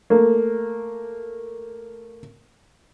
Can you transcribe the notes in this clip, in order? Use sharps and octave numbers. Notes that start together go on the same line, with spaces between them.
A3 A#3